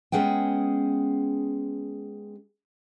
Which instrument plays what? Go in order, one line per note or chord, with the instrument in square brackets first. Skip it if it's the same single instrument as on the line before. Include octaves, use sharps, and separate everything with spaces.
[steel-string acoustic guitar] G#3 B3 C#4 G#4 F#5 G5